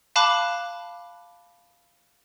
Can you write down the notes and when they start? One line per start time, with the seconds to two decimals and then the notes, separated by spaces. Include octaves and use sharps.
0.16 F5 A5 B5 D6 F#6